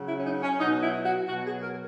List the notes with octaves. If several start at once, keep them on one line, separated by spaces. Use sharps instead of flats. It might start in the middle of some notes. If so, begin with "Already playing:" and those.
Already playing: C#3 F#3
E4
C#4
D#4
C#4
B2 F#3 D#4
E4
F#4
B2 F#3 F#4
G#4
A#4